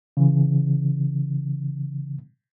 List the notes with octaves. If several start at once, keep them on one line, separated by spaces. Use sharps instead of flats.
C#3 E3